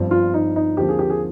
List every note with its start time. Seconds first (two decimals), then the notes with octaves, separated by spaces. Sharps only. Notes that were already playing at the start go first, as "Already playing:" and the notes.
Already playing: G1 G2 F3 C4
0.11 F4
0.34 D#4
0.56 D#4
0.77 D#2 D3 F3 C4 G4
0.89 G#4
0.99 G4
1.10 G#4